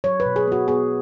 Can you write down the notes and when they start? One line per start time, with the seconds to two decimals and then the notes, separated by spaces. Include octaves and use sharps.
0.04 F#3 C#5
0.20 B4
0.26 B2
0.36 G#4
0.47 B3 F#4
0.68 B3 G#4